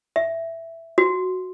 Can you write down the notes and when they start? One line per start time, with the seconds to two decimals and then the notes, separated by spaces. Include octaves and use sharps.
0.16 E5
0.98 F#4